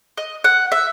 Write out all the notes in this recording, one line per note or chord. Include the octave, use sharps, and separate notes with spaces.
D#5
F#5
E5